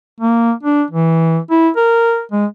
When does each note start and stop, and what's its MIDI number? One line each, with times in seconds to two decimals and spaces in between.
0.20 0.52 58
0.63 0.83 62
0.91 1.38 52
1.51 1.69 64
1.76 2.22 70
2.32 2.46 56